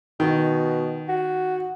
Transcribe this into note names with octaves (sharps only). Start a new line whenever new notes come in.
B2 D#3
F#4